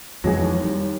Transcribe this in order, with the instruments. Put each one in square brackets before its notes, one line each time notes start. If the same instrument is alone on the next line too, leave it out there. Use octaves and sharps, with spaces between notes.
[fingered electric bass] F2 E3 [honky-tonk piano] F#3 G#3 G#4
[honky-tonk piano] D#2
[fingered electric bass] G3